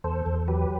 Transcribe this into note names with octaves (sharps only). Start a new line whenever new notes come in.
E2 A4 C5
E2
F#3 G4 B4